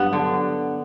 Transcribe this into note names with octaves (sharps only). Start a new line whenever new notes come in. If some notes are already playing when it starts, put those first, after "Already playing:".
Already playing: G2 F#3 B3
D3